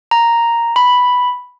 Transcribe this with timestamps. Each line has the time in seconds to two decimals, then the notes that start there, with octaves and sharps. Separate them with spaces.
0.11 A#5
0.76 B5